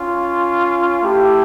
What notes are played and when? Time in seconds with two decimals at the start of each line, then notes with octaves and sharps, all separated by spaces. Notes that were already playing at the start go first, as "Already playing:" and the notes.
Already playing: C#4 F4
1.02 A3 E4 G4